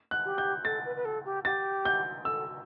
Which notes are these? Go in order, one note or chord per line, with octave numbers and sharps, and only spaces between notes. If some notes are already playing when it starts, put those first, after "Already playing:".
F#6
G4
G6
A4 A6
B4
B4
A4
G4
G4 A6
G6
A4 E6